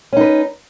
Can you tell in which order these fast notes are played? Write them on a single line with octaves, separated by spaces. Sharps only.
C#4 D#4 B4